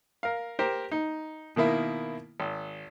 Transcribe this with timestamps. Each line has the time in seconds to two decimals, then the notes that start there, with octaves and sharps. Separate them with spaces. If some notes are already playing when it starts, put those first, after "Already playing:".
0.23 A#4 F5
0.59 G4 A#4 C5
0.91 D#4
1.56 B2 D#3 A#3 E4
2.40 G#1